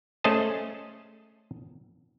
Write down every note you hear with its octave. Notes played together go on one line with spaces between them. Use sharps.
A3 C#4 G#4 C5 D#5 A5